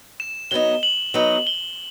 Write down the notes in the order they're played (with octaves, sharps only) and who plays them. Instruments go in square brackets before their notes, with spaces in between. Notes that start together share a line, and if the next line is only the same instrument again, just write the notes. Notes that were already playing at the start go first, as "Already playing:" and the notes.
[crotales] E7
[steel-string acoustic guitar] F#3 B3 D#4 [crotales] G7
[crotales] F#7
[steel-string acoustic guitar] F#3 B3 D#4
[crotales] G7